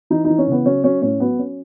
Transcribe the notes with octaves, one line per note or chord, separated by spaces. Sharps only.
E3 D#4
D#4
E3
C#4
C#3 B3
F#3 C#4
F#3 C#4
A2 C#4
F#3 B3
F#3 C#4